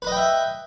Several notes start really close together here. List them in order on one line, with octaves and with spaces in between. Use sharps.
B4 D#5 G5 E5